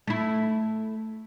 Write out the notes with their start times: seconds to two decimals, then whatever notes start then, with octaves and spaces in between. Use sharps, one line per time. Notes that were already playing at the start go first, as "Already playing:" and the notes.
0.07 A3 E4